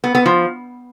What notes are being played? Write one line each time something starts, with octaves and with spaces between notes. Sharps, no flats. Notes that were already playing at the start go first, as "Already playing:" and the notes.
B3
B3
F3